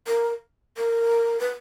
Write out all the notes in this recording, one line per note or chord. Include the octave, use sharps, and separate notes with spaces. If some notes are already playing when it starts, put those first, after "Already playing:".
A#4
A#4
B4